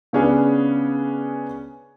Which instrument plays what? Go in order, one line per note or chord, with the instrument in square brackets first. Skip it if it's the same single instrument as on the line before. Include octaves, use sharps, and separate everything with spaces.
[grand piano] C#3 B3 C#4 D4 G#4